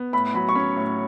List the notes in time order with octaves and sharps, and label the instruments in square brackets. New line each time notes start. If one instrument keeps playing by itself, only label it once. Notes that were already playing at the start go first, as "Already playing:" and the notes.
Already playing: [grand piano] B3
[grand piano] A2 [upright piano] B5
[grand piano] F#3 [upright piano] B5
[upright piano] C#6
[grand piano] C#4 [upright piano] B5
[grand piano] A2